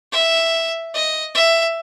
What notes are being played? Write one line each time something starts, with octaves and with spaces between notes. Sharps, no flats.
E5
D#5
E5